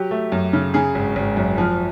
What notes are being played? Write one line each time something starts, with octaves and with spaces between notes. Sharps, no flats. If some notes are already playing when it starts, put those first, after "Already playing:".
Already playing: F#3 G4
A3
F#2
C#3
C#3 G#4
G#1
G#1
F#2
F3